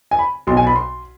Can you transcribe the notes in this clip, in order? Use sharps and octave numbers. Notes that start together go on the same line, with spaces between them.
G#5
B5
B1 B2 C6
G#5
B5
C6